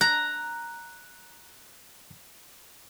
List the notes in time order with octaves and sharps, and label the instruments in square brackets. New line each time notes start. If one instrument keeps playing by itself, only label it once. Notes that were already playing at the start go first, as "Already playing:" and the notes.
[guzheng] A#5 [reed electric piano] F#6